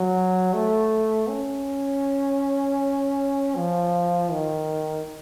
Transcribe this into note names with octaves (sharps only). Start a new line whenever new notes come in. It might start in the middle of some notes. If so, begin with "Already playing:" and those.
Already playing: F#3
A3
C#4
F3
D#3